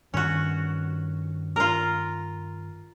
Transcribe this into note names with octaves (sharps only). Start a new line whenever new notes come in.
G2 D#3 C#4 F#4
F4 A#4